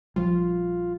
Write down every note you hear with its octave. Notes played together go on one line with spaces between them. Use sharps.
A#1 F3 G3 F4